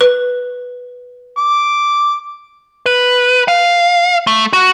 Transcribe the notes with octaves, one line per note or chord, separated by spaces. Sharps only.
B4
D6
B4
F5
A3
F#4